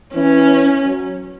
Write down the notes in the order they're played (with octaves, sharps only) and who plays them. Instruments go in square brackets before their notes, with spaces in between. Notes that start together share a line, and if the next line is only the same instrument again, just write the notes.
[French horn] E3 [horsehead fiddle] C#4
[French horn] F#3